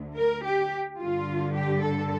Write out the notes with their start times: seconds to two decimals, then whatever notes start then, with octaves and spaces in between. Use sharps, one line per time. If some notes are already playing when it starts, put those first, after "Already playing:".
Already playing: D2 D3
0.15 A#4
0.44 G4
0.99 G2 D3 F4
1.55 G4
1.85 A4